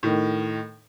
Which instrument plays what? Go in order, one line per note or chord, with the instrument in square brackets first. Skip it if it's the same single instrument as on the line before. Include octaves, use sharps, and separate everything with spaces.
[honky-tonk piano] A2 D#3